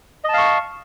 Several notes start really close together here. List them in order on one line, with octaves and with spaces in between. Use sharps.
D#5 A5 F5 C#6